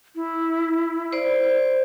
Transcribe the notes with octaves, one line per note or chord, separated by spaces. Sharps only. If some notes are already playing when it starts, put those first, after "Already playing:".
E4
C5 D5